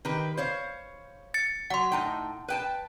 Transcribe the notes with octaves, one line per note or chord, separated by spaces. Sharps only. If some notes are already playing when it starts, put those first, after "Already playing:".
D#3 G4 B4
C5 C#5 F5
A6 C#7
F#3 F#5 C6
A2 D#4 G5
B4 G5 A5